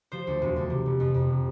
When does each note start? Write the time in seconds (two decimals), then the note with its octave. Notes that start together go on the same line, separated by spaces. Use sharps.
0.12 F3 C5
0.27 D2
0.42 E1
0.56 D2
0.70 C3
0.86 F1
1.00 F2
1.14 F2
1.29 C3